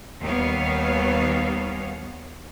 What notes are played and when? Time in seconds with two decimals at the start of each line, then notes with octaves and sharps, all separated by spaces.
0.21 D#2 D#3 G3 B3 C#5 F5